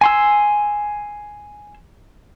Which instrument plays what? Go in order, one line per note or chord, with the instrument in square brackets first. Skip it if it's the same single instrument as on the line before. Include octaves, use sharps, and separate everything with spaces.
[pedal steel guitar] G#5 C6 E6